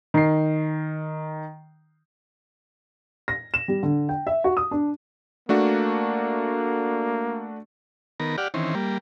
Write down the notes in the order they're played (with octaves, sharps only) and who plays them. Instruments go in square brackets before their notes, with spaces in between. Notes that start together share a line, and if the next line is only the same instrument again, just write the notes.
[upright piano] D#3 C7
A#6
E7
G3
D3
G5
E5
F#4
D#6
D4
[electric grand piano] A3 D4 F#4 [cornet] A#3
[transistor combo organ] D#3 B3 A#4
G4 D5 F#5 F6
D#3 E3 C4 C#4
G3 A#3